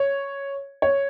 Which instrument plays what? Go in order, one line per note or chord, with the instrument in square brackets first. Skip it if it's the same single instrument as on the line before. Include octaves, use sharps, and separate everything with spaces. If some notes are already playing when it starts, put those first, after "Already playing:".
Already playing: [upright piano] C#5
C#5